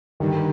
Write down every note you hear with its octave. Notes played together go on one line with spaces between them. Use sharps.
G2 D3 D#3 G3